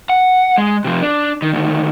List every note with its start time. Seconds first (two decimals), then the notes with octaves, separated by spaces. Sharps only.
0.10 F#5
0.58 G#3
0.85 C3 F3
1.02 D4
1.42 D#3
1.54 D2 D#3